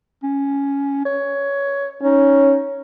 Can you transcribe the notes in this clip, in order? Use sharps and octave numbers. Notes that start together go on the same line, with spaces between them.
C#4
C#5
C#4 D#4